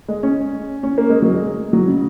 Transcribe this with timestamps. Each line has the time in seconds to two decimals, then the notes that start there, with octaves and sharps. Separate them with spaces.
0.08 G#3
0.23 C#4
0.83 C#4
0.98 A#3
1.10 G#3
1.22 F#3
1.34 G#3
1.73 F#3
1.88 C#3